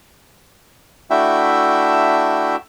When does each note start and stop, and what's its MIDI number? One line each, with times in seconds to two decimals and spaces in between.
1.10 2.56 57
1.10 2.56 62
1.10 2.56 64
1.10 2.56 66
1.10 2.56 76
1.10 2.56 79